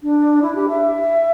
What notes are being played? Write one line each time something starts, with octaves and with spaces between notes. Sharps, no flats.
D4
E4
G4
E5